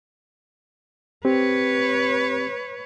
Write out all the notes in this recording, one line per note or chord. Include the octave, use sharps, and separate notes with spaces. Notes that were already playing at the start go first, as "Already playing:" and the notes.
C4 G4 B4 C#5